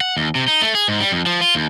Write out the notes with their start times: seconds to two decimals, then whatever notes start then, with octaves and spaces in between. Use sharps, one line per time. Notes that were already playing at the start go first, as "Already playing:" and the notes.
0.01 F#5
0.17 D#2
0.35 C3
0.48 D#4
0.62 A3
0.75 G#4
0.88 G#2
1.00 G3
1.12 F2
1.26 F3
1.41 F4
1.55 D#2